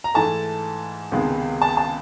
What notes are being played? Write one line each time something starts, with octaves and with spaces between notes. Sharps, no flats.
A#5
G#2 E3 A3 A5
C#2 C3 D#3 G#3 B3
A5
A5